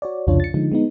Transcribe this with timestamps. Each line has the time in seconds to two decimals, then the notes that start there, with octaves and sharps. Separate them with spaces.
0.02 F#4 C#5 D5
0.27 C2 F2 C#3 D4 F4 C#5
0.40 A6 C#7
0.54 D3 F3 G#3 D#4
0.72 G#3 B3 D#4